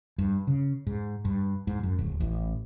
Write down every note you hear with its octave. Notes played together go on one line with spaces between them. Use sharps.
G2
C#3
G#2
G2
G#2
F#2
D1
A1